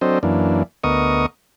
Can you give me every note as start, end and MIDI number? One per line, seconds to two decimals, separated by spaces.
0.01 0.19 54
0.01 0.19 60
0.01 0.19 62
0.01 0.19 69
0.01 0.19 72
0.01 0.19 75
0.23 0.63 42
0.23 0.63 52
0.23 0.63 58
0.23 0.63 62
0.84 1.26 38
0.84 1.26 59
0.84 1.26 70
0.84 1.26 75
0.84 1.26 85
0.84 1.26 87